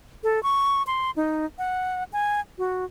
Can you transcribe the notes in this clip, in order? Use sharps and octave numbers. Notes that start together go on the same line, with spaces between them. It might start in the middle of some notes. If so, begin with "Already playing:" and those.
A4
C#6
C6
D#4
F#5
G#5
F#4